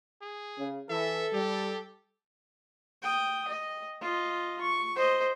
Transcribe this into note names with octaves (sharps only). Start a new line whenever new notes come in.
G#4
C#3
E3 A4 E5
G3 G4
G5 D#6
D#5
F4 D#5
C#6
C5 D#5